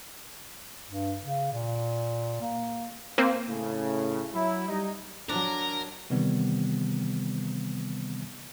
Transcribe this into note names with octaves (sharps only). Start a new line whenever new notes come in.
G2
C#3
A#2
A#3
A#3 C4
A2 C#3
F#3 E4
G3 D#4
F#3 D4 A#4
C3 D#3 E3 G3 B3 C4